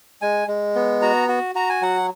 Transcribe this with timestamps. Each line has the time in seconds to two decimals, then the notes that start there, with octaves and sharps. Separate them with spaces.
0.22 G#3 G#5
0.48 G#3
0.75 B3
1.02 F#4 A#5
1.28 F#4
1.55 F#4 A#5
1.69 G#5
1.82 F#3 F#5